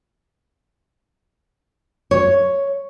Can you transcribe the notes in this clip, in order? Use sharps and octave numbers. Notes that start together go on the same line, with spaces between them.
C#5